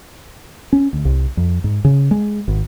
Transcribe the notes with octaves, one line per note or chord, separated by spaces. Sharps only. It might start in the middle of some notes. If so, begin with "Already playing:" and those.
C#4
D2
C2
F2
G#2
C#3
G#3
G#1